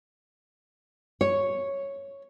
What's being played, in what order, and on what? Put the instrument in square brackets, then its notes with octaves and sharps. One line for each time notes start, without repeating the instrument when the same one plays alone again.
[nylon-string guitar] C#5